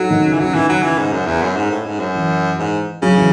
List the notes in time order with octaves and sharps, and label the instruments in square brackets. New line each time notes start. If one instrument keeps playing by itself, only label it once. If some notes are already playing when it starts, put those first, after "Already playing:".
Already playing: [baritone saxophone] F#3 [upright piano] D#4 F#4 A4
[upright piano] D#3
C#3
[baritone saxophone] E3
[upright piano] C#3 [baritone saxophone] F#3
[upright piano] D#3 [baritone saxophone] E3
[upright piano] C#3 [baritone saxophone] F#3
[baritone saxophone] E3
G#2
F#2
E2
F#2
G#2
A2
G#2
F#2
[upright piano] E3
[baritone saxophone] G#2
[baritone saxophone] C#3 [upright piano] F#3
[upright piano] E3